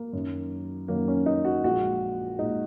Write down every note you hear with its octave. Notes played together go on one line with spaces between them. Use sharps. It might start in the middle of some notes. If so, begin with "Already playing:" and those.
Already playing: A#3
F#2 D#3 F#3
F#2 D#3 F#3 A#3
C#4
D#4
F#4
A#1 A#2 G#3 F#4
A#2 G#3 D#4